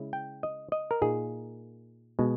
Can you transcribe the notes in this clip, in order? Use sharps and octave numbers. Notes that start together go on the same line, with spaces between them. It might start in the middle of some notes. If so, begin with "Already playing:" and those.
Already playing: C#3 G#3 C#4 E4
G5
D#5
D#5
A#4
A#2 A#3 D#4 G#4
B2 G#3